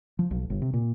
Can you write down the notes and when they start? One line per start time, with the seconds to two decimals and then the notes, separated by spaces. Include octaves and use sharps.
0.19 F3
0.31 B1
0.50 G1
0.62 C3
0.74 A#2